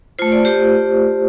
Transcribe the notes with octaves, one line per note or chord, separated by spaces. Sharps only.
A3 F4 C5
D5
G4 C5